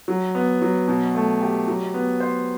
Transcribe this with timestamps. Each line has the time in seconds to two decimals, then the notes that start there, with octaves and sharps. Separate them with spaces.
0.08 F#3
0.35 B3
0.62 F#3
0.88 B2
1.15 A3
1.41 G4
1.67 F#3
1.94 B3
2.20 C5